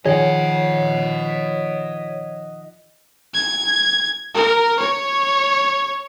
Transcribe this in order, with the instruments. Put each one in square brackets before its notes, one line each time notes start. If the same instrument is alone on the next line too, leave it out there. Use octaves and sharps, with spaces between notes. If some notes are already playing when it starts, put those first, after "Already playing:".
[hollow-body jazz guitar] D#3 F3 G#4 [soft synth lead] C#5 [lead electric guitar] D#5 F#5
[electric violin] G#6
A#4
C#5